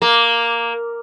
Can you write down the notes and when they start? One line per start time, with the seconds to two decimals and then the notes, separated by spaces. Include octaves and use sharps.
0.02 A#3